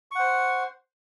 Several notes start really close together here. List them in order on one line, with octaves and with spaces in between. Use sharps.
C#6 F#5 C5